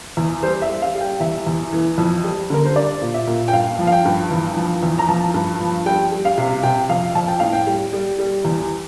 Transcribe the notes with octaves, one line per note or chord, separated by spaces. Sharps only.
E2
G3 C5
E5
G3
F5
G3
G5
E2 E5
E2
E3
F2
G3
D3 A#4
C5
G3 D5
A#2
E5
A#2
G5
G2 F5
F3
F5
G5
G2
E2
F3
E2
A#5
F3 A5
G2
F3
G3 G5
G3
F5
C3
C3 G5
F2 F5
F2 A5
G5
A2 F5
G5
G3
G3
G3
E2